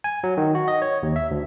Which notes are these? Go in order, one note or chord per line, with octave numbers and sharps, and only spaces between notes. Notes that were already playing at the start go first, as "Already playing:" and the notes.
G#5
F#3
D#3
F#4
D#5
C#5
D#2
E5
D2